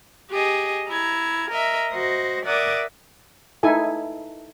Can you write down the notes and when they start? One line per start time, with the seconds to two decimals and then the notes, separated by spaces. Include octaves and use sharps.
0.31 G4 G#4 D#5
0.87 E4 A#5 G#6
1.50 A#4 D#5 E5
1.91 F#4 C5 D#5
2.44 A#4 D5 E5 F#5 D6 D#6
3.63 D#4 E4 A4 G#5